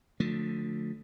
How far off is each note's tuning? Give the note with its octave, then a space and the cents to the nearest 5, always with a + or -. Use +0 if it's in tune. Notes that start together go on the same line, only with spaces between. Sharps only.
D3 +0 F3 +35 A3 +5